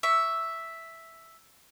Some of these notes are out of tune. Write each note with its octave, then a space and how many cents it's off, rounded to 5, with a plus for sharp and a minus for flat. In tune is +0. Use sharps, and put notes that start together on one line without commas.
E5 +0 C#6 +25